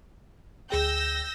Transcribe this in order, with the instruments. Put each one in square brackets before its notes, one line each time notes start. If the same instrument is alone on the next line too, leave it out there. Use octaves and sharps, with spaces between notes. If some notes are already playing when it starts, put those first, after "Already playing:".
[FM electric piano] D2 G#4 G5 [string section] E6 G6 A#6